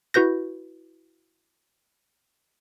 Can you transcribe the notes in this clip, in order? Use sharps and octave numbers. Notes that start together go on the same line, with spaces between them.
E4 F#4 B4 G6 A#6